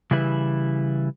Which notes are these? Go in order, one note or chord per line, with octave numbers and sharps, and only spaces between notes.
C#3 E3 G3 E4 B4